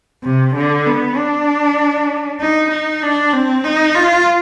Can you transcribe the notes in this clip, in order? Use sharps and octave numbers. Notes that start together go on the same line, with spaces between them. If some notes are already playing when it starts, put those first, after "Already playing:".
C3
D3
B3
D4
D#4
D#4
D4
C4
D#4
F4